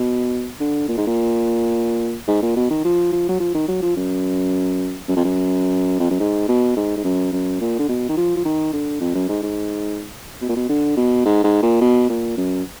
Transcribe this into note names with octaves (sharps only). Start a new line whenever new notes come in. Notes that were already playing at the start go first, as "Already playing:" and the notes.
Already playing: B2
D3
A#2
G#2
A#2
G#2
A#2
B2
D#3
F3
F3
F#3
F3
D#3
F#3
F3
F#2
F#2
F2
F#2
F2
F#2
G#2
B2
G#2
G#2
F#2
F#2
A#2
D3
B2
D#3
F3
F3
D#3
D3
F2
F#2
G#2
G#2
B2
A#2
B2
D3
B2
G#2
G#2
A#2
B2
A#2
F#2